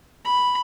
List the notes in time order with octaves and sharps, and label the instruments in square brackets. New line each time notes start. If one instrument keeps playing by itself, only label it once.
[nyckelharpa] B5